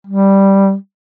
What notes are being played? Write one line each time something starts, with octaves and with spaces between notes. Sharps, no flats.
G3